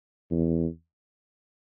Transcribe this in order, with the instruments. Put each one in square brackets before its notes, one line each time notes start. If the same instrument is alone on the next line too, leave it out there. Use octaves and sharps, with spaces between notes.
[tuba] E2